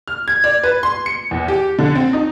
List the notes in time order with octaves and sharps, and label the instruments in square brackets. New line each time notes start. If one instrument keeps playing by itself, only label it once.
[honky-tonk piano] F6
G#6
D5
B4
C6
C#7
E2
G4
D3
C4
D#4